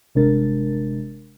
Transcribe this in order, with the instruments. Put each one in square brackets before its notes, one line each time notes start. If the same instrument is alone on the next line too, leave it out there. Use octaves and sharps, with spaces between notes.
[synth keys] G1 C3 G#3 D4 A#4 A6